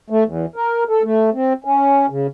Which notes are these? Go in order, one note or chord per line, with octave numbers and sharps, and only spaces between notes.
A3
E2
A#4
A4
A3
C4
C#4
C#3